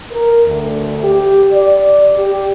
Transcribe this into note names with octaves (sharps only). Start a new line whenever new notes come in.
A#4
D2
G4
D5
G4